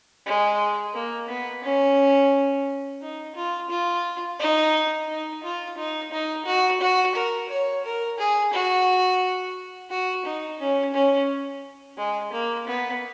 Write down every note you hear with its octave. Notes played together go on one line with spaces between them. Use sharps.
G#3
A#3
B3
C#4
D#4
F4
F4
D#4
D#4
F4
D#4
D#4
F#4
F#4
A#4
C#5
A#4
G#4
F#4
F#4
D#4
C#4
C#4
G#3
A#3
B3